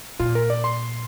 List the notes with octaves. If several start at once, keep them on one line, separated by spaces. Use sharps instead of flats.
A#2 F4
A#4
D5
C6